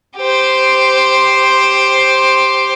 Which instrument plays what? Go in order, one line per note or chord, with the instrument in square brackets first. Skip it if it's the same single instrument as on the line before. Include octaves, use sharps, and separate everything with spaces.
[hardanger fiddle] G4 C5